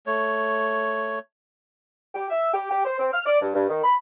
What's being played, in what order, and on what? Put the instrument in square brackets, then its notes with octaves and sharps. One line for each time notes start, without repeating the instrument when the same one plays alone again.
[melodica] A3 C#5
[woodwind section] G4
E5
G4
G4
C5
C4
F6
D5
G2
G2
D#3
B5